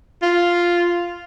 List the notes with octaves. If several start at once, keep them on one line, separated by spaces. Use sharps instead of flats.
F4